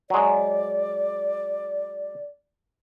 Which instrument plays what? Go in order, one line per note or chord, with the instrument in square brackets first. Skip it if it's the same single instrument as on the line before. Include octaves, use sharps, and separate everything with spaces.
[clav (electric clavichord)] F#3 G#3 [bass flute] D5